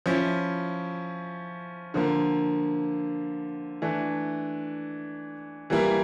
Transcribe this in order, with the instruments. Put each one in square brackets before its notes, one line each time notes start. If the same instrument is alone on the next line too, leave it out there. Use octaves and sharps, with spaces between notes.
[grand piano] F3 C#4 E4
D3 F3 A#3
E3 A3 D4
E3 G3 A#3 E4